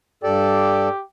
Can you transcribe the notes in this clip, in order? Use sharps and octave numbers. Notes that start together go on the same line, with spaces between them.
G2 G4 A4 D5